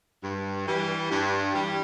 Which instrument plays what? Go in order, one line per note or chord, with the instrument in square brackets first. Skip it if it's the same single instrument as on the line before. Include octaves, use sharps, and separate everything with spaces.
[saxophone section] G2
E3 G3
G2
E3 G3